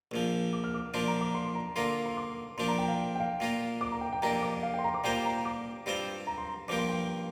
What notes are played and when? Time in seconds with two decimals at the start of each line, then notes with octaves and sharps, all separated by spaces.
0.11 A#1 A#2 F3
0.53 D6
0.64 F6
0.74 D6
0.94 A#2 F3 D4 C6
1.07 A#5
1.21 D6
1.35 C6
1.55 A#5
1.76 D3 A#3 F4 C6
2.06 C6
2.17 D6
2.57 A#2 F3 D4 C6
2.68 A#5
2.78 G5
2.88 F5
3.15 G5
3.20 F5
3.40 A#2 A#3 F4
3.81 D6
3.92 A#5
4.01 G5
4.13 G5
4.22 F2 C3 A#3 D4 A#5
4.42 D6
4.63 F5
4.74 G5
4.79 C6
4.84 A#5
4.94 D6
5.04 A#2 G3 A#3 F4 C5 G5
5.25 A#5
5.45 D6
5.86 G2 G3 C4 F4 C5
6.27 A#5
6.38 C6
6.68 G2 F3 A#3 G4 D6
6.78 C6
6.89 G5